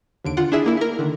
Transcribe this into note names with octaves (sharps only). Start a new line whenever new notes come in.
D#2 D3 D7
D3 F4 F#5
D4 E4 G#4 E5
A#3 E4
E4 A#4
D3 D#3